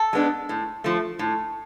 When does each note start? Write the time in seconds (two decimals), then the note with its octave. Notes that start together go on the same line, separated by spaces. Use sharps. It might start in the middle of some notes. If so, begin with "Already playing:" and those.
Already playing: A4
0.13 G#3 B3 D4
0.49 A2
0.84 F3 A3
1.19 A2